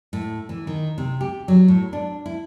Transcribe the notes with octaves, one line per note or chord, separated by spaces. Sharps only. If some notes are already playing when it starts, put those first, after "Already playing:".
A2
E3
D#3
C3
G4
F#3
A2
D4
E4